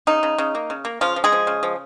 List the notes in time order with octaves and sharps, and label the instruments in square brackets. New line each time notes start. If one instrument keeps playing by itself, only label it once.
[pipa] C#3 D#4
C#3
C#3
A#3
C#3
A#3
C#3 F3 F4
F3
G#3 G#4
F3
C#3
F3